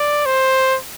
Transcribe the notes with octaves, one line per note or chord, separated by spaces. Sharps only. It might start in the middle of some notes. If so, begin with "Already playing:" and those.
Already playing: D5
C5